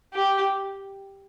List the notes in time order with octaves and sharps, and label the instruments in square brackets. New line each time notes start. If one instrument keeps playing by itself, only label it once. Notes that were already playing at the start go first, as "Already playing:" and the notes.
[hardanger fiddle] G4